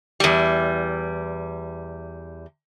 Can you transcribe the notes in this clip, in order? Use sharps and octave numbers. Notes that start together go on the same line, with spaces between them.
E2 G3